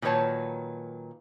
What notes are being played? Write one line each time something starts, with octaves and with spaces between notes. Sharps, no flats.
A#2 D#3 F#3 B4 C#5 A5